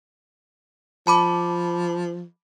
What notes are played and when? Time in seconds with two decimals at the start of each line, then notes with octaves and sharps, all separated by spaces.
1.07 F3 A5 B5 D6